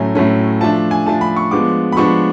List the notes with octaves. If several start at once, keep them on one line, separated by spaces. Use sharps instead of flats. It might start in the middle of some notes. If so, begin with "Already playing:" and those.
Already playing: A2 F#3 A3 C#4 G#5
A2 F#3 A3 C#4
F3 A3 D4 A5
G#5
F3 A3 D4 A5
B5
C#6
F3 G#3 B3 D4 D6
B5
F3 G#3 B3 D4 C#6